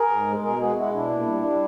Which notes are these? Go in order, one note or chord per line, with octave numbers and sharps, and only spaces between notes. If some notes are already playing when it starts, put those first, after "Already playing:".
Already playing: G#4 A#4
G#2
G#3
B2 G#4 A#4
G#3 F#4 G#4
G#3 E4 F#4
B2 D4 E4
A#2
G3
G3